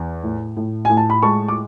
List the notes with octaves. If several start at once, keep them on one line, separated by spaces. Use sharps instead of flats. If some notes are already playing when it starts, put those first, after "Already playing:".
Already playing: E2
A2
A2
A2 G#5
A5
B5
G#3 A5 C#6
D6